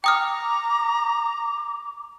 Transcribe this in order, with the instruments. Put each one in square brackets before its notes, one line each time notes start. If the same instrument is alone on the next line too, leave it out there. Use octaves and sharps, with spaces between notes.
[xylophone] G5 D#6 F6 [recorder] A#5 [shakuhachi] D6